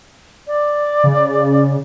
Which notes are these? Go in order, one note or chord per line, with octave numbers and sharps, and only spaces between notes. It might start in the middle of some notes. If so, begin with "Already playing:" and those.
D5
C#3